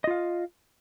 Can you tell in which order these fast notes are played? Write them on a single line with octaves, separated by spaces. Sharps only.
D#5 F4 F5